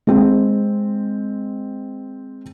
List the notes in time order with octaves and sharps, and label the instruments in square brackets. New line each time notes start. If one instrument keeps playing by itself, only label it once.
[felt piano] G#3 C4